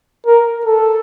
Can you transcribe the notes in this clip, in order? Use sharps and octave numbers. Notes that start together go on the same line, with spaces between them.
A#4
A4